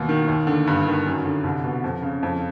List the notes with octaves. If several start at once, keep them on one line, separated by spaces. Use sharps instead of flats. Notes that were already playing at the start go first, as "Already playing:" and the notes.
Already playing: D#2 B2
D#3
D#2
D3
G2
D#3
F#2
D3
C2
B2
F2
C#3
F2